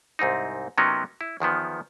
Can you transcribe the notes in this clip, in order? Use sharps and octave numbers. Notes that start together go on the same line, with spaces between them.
C2 G#2 C4 D#4
C3 F#3 B3 C#4 D#4 A#4
E4
E2 D#3 F3 B3